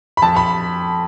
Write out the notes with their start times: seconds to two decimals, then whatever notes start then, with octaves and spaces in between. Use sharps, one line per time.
0.17 B5
0.22 F2 A5
0.36 B5